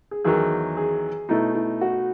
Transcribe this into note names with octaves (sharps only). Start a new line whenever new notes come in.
G#4
E2 D#3 F#3 G#4
G#4
B2 A3 D#4 E4
E4
F#4